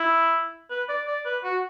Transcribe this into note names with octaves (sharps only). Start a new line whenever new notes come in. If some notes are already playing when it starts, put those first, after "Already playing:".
Already playing: E4
B4
D5
D5
B4
F#4